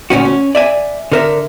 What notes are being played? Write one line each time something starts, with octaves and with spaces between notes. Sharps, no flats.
D2 A#2 C#4 F#4
C#4
D5 E5 G#5
D3 A#4 E5